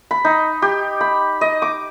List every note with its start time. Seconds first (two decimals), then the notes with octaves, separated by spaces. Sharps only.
0.11 B5
0.25 D#4
0.62 G4
1.01 B5
1.41 D#5
1.62 D6